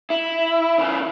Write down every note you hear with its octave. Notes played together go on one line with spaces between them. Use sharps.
E4
C#3 E3